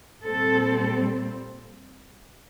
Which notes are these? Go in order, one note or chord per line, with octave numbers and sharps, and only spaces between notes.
A#2 G3 C4 A4